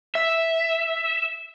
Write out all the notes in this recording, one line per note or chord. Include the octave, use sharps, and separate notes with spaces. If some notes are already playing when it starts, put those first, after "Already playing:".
E5